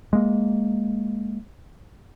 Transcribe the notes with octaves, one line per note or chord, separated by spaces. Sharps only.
G#3 A#3